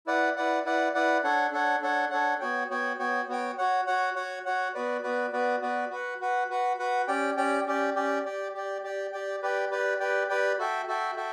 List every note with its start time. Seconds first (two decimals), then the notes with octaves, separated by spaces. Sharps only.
0.06 E4 B4 D5 F#5
0.36 E4 B4 D5 F#5
0.65 E4 B4 D5 F#5
0.94 E4 B4 D5 F#5
1.24 D4 A4 C#5 F#5
1.52 D4 A4 C#5 F#5
1.82 D4 A4 C#5 F#5
2.11 D4 A4 C#5 F#5
2.40 B3 F#4 C#5 G5
2.70 B3 F#4 C#5 G5
2.99 B3 F#4 C#5 G5
3.28 B3 F#4 C#5 G5
3.58 F#4 C#5 F#5
3.86 F#4 C#5 F#5
4.16 F#4 C#5 F#5
4.45 F#4 C#5 F#5
4.74 B3 F#4 B4 D5
5.03 B3 F#4 B4 D5
5.33 B3 F#4 B4 D5
5.61 B3 F#4 B4 D5
5.90 F#4 B4 F#5
6.20 F#4 B4 F#5
6.50 F#4 B4 F#5
6.79 F#4 B4 F#5
7.07 C#4 G4 D5 G5
7.37 C#4 G4 D5 G5
7.67 C#4 G4 D5 G5
7.95 C#4 G4 D5 G5
8.25 G4 D5 G5
8.54 G4 D5 G5
8.83 G4 D5 G5
9.13 G4 D5 G5
9.42 G4 B4 D5 G5
9.71 G4 B4 D5 G5
10.00 G4 B4 D5 G5
10.29 G4 B4 D5 G5
10.58 F#4 A4 E5 G5
10.87 F#4 A4 E5 G5
11.16 F#4 A4 E5 G5